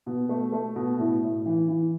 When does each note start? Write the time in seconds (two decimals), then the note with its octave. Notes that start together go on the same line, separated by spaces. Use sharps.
0.06 B2
0.29 A3
0.52 A3
0.76 B2
0.99 A2
1.23 A2
1.46 E3
1.68 E3